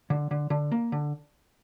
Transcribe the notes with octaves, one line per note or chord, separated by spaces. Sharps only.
D3
D3
D3
A#3
D3